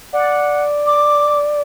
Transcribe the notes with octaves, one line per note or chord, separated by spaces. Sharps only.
D5 F#5
D6